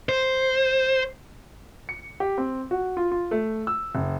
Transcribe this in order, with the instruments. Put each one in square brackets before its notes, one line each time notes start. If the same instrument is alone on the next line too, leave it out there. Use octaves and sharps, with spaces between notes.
[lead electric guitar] C5
[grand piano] C#7
G4
C4
F#4
F4
F4
A3
E6
F#1